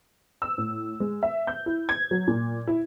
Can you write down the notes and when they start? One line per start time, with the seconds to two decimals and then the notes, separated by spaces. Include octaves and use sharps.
0.42 E6
0.58 A2
1.00 G#3
1.23 E5
1.47 G6
1.66 E4
1.89 G#6
2.11 F#3
2.28 A#2
2.67 E4